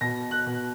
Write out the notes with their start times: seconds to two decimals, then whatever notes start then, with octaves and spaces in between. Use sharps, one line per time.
0.01 B2 A#6
0.31 F#6
0.46 B2